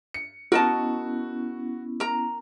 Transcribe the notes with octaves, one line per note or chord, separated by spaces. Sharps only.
C#7
B3 C#4 E4 F#4 A#4 D#5 A5
A#4 A#5